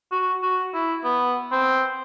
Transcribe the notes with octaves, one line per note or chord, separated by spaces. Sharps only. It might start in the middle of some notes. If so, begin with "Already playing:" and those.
F#4
F#4
E4
B3
C4